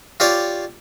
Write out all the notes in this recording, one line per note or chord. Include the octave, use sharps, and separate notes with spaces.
F4 G4 C#5 D5